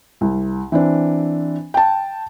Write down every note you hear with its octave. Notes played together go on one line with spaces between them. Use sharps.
C2
E3 C4 D4
G5 A5